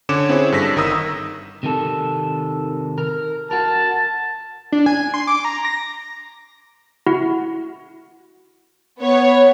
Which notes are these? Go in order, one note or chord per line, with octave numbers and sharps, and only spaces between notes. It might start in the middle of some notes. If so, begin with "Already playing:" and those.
D3 C#4 C#5 D6 E7
C4 E4 G#4 C#5
G2 A4 E6 A#6 B6
G1 D#3 A#5 D#6 E6
C3 D#3 A4
A#4
F#4 A#4 A5
D4
G#5
C6
D6
A#5
A#6
E4 F#4 F#5
B3 C#5